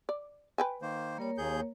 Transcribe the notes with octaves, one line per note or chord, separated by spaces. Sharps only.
D5
B4 G5 G#5
D#3 A#3 C5
G3 A#3 A#4 C#5
D#2 G#4 G6